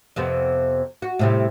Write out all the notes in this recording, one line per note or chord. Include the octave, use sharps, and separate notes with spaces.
F2 C3 B3
F#4
A2 C3 G3